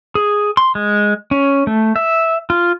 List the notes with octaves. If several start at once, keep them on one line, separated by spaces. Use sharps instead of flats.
G#4
C6
G#3
C#4
A3
E5
F4